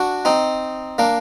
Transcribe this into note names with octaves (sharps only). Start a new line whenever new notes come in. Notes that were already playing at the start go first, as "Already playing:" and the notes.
Already playing: D4 F#4
C4 D#4
A#3 D4